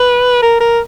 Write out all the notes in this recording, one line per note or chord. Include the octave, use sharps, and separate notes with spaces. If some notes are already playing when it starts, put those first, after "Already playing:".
Already playing: B4
A#4
A#4